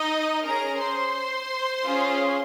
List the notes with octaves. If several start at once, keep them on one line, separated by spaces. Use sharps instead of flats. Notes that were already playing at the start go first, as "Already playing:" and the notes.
Already playing: D#4 D#5
C#4 G#4 A#4 A#5
C5 C6
C#4 F4 G#4